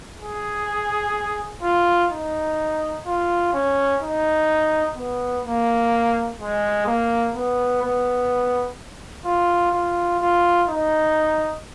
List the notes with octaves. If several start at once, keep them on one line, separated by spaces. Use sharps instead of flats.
G#4
F4
D#4
F4
C#4
D#4
B3
A#3
G#3
A#3
B3
B3
F4
F4
F4
D#4